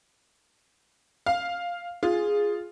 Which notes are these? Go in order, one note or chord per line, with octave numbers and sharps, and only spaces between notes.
F5
F4 G#4